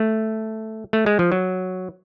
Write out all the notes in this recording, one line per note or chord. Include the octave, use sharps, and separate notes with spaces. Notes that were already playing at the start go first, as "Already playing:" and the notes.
Already playing: A3
A3
G#3
F3
F#3